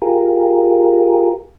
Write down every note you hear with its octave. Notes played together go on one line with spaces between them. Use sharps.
F4 G4 G#4 A#4